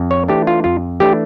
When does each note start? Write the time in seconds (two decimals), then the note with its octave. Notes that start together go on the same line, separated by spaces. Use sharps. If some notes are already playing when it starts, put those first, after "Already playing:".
Already playing: F2
0.11 C#5
0.28 E3 A3 D4 G4
0.47 F4
0.64 F2 F4
1.00 E3 A3 D4 G4